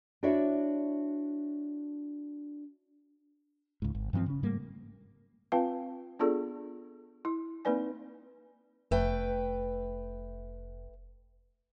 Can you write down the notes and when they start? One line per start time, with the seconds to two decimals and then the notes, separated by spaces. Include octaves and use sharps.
0.23 D4 E4 F#4 C#5 D5 E5
3.82 C#2 G#2
3.95 G#1
4.13 G2 E3 F3 C4
4.26 C#3 C#4
4.43 G#2 G3 A3 A#3
5.52 C4 F4 B4 F5 G5 A5
6.19 B3 D4 F4 G#4 A4 D5
7.25 E4
7.65 A#3 C4 D#4 B4 D5 G#5
8.91 F1 A3 B4 G5